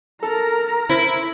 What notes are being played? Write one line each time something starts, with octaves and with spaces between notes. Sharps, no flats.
A4 A#4 A#5
E4 C5 B5